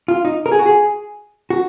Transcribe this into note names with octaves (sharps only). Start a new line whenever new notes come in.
F4
D#4
A#4
G#4
F#4
G#4
F#4